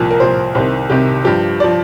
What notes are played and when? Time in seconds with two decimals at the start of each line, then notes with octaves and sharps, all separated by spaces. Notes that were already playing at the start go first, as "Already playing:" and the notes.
Already playing: C2 A#2 F3
0.11 A#4
0.20 C2 A#2 F3 C5
0.55 C2 C3 D#3 C5
0.90 C2 C3 D#3 G4
1.24 G2 F3 G4
1.60 F3 D5